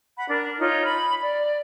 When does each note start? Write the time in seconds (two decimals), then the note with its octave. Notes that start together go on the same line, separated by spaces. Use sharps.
0.16 F#5 B5
0.28 D4 A#4
0.59 D#4 F4 C#5
0.84 B5
1.22 D5